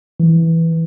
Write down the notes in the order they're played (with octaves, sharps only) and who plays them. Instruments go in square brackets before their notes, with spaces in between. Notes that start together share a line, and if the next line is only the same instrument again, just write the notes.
[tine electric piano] E3